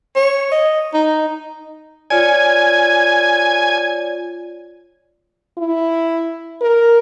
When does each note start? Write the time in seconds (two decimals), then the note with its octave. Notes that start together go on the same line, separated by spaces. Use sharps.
0.16 C#5
0.52 D#5
0.94 D#4
2.10 F4 C#5 D5 G#5
5.58 E4
6.62 A#4